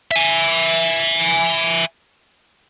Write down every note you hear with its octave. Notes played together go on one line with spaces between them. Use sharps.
E5 G#5